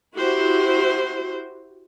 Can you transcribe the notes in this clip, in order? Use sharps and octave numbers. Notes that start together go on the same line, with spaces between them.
E4 F#4 G4 C5